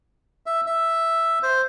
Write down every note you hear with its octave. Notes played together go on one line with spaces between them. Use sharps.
E5
E5
C5